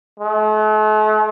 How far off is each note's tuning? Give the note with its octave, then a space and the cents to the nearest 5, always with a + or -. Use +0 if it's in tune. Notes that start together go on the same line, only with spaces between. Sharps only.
A3 -45